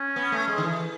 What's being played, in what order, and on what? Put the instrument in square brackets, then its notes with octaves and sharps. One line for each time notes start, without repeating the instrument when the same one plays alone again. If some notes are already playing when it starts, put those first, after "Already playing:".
Already playing: [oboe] C#4
[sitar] B3
A3
G#3
D#3
E3